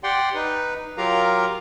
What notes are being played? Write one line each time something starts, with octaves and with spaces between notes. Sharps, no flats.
G4 D5 F#5 G5 C6
D#4 B4
F#3 F4 G4 A#4 F5 A#5